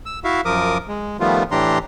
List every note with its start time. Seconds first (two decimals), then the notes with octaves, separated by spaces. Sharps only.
0.06 E6
0.24 E4 F#4 E5 F5
0.45 F#2 F3 A#4 D6 D#6
0.88 G#3
1.20 D#3 F3 G3 A3 B3 F4
1.51 A2 E3 D4 G4 A#5 C6